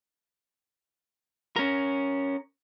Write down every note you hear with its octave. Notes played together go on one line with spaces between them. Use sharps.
C#4 A#4